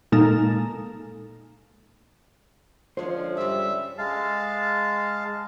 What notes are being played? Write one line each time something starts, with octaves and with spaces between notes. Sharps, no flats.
A#2 G#3 A#3 D#4 A4
D3 F3 G#3 C#4 C5
G2 C#3 G3 E5
G#3 F5 A5